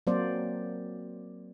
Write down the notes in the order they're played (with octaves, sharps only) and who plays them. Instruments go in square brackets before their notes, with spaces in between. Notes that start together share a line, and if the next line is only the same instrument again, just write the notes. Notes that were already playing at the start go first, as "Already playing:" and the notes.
[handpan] F#3 A#3 C4 C5 D5